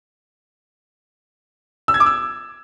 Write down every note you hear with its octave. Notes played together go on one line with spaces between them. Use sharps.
E6
G#6
D6
E6